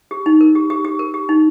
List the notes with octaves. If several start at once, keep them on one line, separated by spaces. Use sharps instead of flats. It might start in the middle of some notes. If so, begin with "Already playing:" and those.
G4
D#4
A#4
G4
G4
G4
A#4
G4
D#4